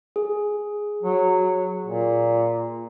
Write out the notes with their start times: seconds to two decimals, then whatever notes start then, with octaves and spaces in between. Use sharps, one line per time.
0.16 G#4
1.03 F#3
1.86 A#2